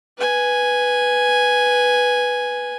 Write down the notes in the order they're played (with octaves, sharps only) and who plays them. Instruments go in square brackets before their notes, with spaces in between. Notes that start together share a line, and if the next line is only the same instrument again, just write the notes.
[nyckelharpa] B4 G#5